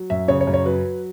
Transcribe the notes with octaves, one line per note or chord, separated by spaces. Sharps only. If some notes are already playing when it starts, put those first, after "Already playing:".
Already playing: F#3
F#2 E5
C#3 C#5
C#5
F#2
C#5
F#3 B4